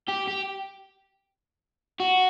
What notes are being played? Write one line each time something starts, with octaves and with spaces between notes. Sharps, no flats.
G4
G4
F#4